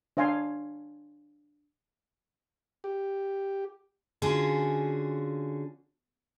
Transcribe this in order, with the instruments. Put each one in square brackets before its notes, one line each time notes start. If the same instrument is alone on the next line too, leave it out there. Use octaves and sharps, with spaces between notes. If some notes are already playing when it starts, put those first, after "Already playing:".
[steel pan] D4 C#5 F5 G#5 C6
[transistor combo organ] G4
[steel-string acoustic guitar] D3 C#4 F4 F#4 G#4